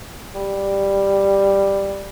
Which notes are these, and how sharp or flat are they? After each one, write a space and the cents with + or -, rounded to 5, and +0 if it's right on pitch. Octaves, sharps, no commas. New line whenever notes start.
G3 +5